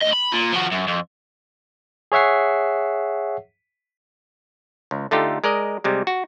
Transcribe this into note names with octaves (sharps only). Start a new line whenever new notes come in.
D2 D#5
B5
A#2
F3 F#4
F#2
F2
G#4 C#5 E5 F#5 C7
C#2
D3 A3 D#4 F4 G4
G#3 A#4 D5 D#5
C3 G3 G#3
F#4